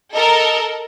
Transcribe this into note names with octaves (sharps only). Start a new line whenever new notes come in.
A4 A#4 D#5